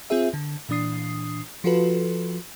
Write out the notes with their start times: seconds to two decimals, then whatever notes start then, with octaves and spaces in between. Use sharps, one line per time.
0.10 C4 F4 G#4 E5
0.34 D3
0.69 A#2 E3 D4 D#6 C7
1.64 F3 F4 F#4 A4 B4